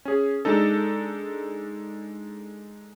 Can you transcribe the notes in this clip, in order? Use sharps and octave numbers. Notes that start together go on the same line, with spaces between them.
C#4 G#4
G#3 D4 D#4 A4